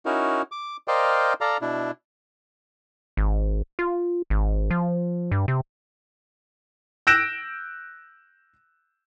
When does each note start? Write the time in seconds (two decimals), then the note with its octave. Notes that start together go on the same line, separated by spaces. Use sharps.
0.06 C#4 D#4 E4 F#4 A#4
0.52 D6
0.88 A#4 C5 D5 D#5 F5 G5
1.41 A4 D5 F5 A#5
1.61 B2 D4 E4
3.17 G#1
3.79 F4
4.30 G#1
4.71 F3
5.32 G2
5.48 C3
7.07 E6 F#6 G6 A#6 D7 E7